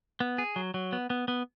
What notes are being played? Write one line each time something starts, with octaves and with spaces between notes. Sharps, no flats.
B3
G#4
F#3
F#3
B3
B3
B3